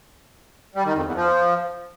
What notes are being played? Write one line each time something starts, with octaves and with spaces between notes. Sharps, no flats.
G3
D#3
F2
E2
F3